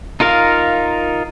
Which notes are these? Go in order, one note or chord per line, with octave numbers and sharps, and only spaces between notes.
D#4 F4 A#4 F5